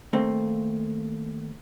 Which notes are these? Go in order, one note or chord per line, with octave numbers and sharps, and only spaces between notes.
D#2 A3 A#3 C4